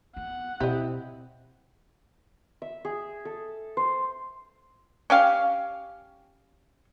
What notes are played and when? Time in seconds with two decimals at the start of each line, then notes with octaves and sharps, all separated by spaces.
0.16 B3 F#5
0.60 B2 C4 E4 G4 D#5
2.62 E5
2.85 G#4
3.25 A4
3.77 C5
5.10 C#4 G4 F5